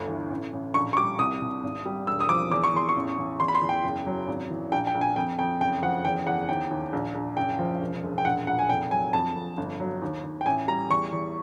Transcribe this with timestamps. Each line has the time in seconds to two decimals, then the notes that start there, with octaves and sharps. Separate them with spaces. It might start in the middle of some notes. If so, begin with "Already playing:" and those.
Already playing: G1 D2
0.08 E3
0.30 A1
0.53 A1
0.74 A#1 C#6
0.93 C#6
0.97 G3 D6
1.19 C2 D#6
1.42 C2
1.63 G#1
1.86 G3
2.07 E1 E6
2.20 D#6
2.29 F3 D6
2.51 E2 D6
2.64 C#6
2.74 E2 C6
2.89 C#6
2.96 A1
3.18 A1
3.40 E2 C6
3.48 B5
3.55 C6
3.61 E2
3.69 G5
3.84 F#1
4.07 F#3
4.28 G#1
4.50 E3
4.72 A#1 G5
4.87 G5
4.95 A#1
5.01 G#5
5.16 F2 G5
5.39 F2 G5
5.60 F#1 G5
5.82 F3 F#5
6.05 E2 G5
6.26 E2 F#5
6.49 D#2 G5
6.71 D#2
6.93 A#1
7.15 A#1
7.37 F#1 G5
7.59 F3
7.82 E1
8.03 E1
8.18 G5
8.25 A#1 F#5
8.47 A#1 F#5
8.59 G#5
8.69 F1 G5
8.91 F#3 G#5
9.13 F2 A5
9.36 F2
9.57 G1
9.80 F#3
10.02 D#2
10.23 D#2
10.41 G5
10.46 A1 G#5
10.68 G3 A#5
10.90 E2 C#6
11.12 E2